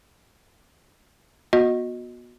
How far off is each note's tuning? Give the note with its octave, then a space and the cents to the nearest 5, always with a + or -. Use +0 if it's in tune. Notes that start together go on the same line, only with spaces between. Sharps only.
B3 -30 F#4 -25 D#5 +0